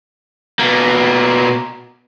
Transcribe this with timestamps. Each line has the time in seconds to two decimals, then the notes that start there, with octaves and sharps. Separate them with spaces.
0.59 B2 A#3